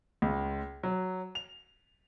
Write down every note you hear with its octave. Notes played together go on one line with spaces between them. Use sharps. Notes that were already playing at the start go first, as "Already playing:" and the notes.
C#2
F#3
F7